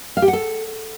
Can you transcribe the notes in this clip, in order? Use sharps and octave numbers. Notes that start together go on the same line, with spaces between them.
F5
G4
F#5
A4